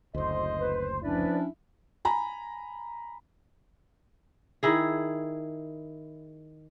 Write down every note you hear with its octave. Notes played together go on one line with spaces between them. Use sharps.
F#1 D2 C5 D#5
B4
F3 C#4 D4 E4 B4 D5
G#5 A#5 B5
D#3 E4 G#4